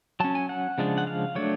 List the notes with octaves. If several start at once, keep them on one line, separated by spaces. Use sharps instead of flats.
F#3 C#4 A5
G#5
F#5
C#3 F3 G#3 D4
F#5
F5
F#3 A3 D4 C#5